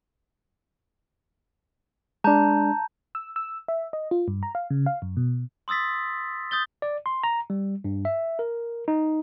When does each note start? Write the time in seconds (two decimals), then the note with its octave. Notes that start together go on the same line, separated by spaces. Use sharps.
2.24 G#3 D4 A5 A#5 G6
3.15 E6
3.36 E6
3.68 E5
3.93 D#5
4.11 F4
4.28 G2
4.43 A#5
4.55 F5
4.70 C#3
4.86 F5
5.02 F#2
5.17 B2
5.68 C6 D#6 E6 A6 B6
6.51 D#6 G6 A6 G7
6.82 D5
7.06 C6
7.23 A#5
7.50 G3
7.84 G2
8.05 E5
8.39 A#4
8.88 D#4